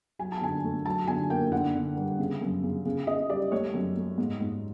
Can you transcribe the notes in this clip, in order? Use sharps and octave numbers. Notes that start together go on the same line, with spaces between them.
F#3 G#5
A5
D3 G#5
A3
F#3 A5
D3 G#5
A#3 G5
D3 F#5
D3
G2
C#3
F#2
C#3
C#3
C#3 D#5
G3 D5
A3 C#5
F#2
A3
G#2
G#2